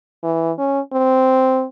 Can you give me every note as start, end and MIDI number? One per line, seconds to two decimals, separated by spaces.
0.23 0.52 52
0.58 0.80 61
0.93 1.65 60